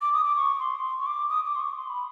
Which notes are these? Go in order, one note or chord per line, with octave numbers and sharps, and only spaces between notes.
D6
D#6
D6
C#6
C6
C#6
D6
D#6
D6
C6
C#6
C6
B5